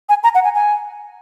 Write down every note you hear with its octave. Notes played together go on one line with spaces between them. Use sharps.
G#5
A#5
F#5
G#5
G#5